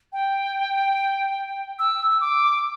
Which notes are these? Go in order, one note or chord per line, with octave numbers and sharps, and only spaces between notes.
G5
E6
E6
D6